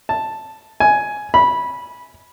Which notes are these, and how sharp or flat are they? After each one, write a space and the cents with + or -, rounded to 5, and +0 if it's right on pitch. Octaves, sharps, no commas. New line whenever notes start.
A5 +0
G#5 +10
B5 -15